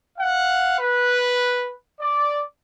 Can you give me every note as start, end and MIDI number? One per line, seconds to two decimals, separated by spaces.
0.18 0.78 77
0.18 0.78 78
0.79 1.71 71
2.00 2.42 74